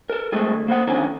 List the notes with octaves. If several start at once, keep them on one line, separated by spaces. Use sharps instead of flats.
A4 A#4
G#3 A3 C4 G#4 A4
D2
A#3 C5 F#5
D3 D#3 F3 C4 C#4